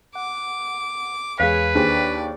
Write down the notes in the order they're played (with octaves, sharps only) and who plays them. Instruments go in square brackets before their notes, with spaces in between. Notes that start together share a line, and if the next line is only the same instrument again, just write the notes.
[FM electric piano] F#5 [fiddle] D6
[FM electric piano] E2 G#3 [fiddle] G#4 C#5 [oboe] B4 [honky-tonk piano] F5
[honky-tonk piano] D#2 [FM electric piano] D4 G#4 C5 [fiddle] D5